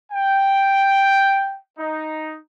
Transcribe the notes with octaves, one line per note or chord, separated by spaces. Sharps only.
G5
D#4